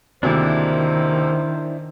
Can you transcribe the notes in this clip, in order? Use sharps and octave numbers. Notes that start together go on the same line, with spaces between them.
D2 C3 D#3 A#3 D4 E4 C5